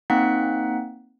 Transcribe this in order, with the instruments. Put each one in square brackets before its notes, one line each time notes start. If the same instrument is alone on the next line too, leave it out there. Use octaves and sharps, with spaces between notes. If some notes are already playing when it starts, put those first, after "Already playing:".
[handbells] A#3 C4 D#4 F#5 F#6 B6